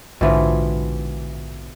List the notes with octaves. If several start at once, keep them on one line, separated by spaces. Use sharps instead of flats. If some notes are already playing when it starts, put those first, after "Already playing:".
A#1 G#2 B2 D3 E3 F3